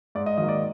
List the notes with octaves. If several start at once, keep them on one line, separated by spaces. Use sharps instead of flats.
G#2 D5
D#5
D#3 F#3 A#3 D#5
D5